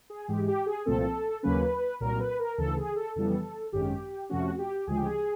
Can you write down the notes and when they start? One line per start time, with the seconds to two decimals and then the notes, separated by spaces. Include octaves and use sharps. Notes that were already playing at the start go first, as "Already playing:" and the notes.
0.10 G#4
0.28 G#2 E3 G#3 G4
0.48 G4
0.66 G#4
0.86 C2 A#2 F3 A3 C4 A4
1.43 D#2 C#3 F#3 A#3 C#4 B4
2.00 C2 A#2 F#3 A#4
2.20 B4
2.39 A#4
2.58 D2 C#3 E3 A4
2.77 G#4
2.96 A4
3.15 F2 C#3 E3 G3 B3 A4
3.72 G#1 F#2 D#3 G#3 C#4 G4
4.30 F2 C3 F3 A3 C#4 F#4
4.58 G4
4.87 D2 C#3 F3 G#3 G#4
4.97 G4
5.05 G#4